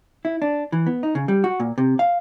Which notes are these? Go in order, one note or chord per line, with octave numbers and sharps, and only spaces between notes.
E4
D4
E3
B3
D#4
C#3
G3
F#4
A#2
C3
F5